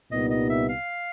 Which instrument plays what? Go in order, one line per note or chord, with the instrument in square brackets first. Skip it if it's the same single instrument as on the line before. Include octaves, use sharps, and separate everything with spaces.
[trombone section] C2 A#2 G3 B3 D#4 [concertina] D#5
[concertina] D#5
E5
F5